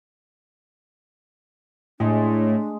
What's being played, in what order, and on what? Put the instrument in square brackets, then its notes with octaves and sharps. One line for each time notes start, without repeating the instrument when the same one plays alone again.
[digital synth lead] A2 [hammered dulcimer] G#3 A3 G#4 [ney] D4